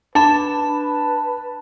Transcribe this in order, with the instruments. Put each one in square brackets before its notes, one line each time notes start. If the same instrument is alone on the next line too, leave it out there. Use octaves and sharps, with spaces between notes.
[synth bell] D4 B5 E7 [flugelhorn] B4 [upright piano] A5